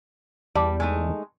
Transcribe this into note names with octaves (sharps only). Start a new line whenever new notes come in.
E2 G3 D5 A5
G#3 A3 D#4